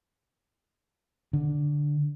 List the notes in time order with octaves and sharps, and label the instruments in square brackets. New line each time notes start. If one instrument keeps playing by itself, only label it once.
[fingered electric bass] D3